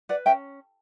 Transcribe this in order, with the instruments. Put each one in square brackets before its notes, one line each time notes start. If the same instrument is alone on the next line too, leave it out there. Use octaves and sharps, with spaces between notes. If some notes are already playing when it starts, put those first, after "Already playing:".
[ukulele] B4 D5 F#5
C#4 E5 G5